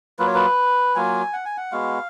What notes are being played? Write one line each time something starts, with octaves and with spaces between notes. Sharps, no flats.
F#3 A#3 F4 B4
C#5
B4
F#3 A#3 F4 G#5
F#5
G#5
F#5
G#3 B3 F#4 F5